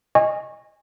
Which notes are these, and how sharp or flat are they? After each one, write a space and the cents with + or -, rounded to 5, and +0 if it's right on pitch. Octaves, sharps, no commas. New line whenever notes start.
D#5 +0 G#5 -25 C#6 -20